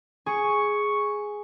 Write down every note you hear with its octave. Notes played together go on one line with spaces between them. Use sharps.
G#4 C#6